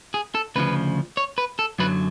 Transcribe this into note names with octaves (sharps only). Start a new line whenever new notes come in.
G#4
A4
D2 C#3 F3 B4
C#5
B4
A4
F#2 D3 F#3 B4